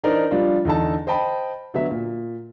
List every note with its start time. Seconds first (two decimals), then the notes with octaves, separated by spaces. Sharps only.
0.03 E3 D4 D#4 A#4 C5 D5
0.31 F3 G3 D4 F4
0.65 E2 D3 D#4 A4 A5
1.07 C5 D#5 G5 A5 B5
1.74 D3 F#3 B3 E5
1.91 A#2